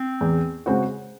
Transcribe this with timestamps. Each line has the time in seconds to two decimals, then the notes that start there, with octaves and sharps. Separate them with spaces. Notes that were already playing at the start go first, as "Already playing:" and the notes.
Already playing: C4
0.21 E2
0.66 C#3 G#3 C4 F#4